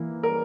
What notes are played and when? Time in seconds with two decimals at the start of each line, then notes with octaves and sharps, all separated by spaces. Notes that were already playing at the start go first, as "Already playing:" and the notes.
Already playing: E3 A#3 E4
0.23 A#4